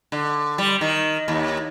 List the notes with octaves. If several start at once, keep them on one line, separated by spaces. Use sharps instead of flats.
D3
G3
D#3
D#2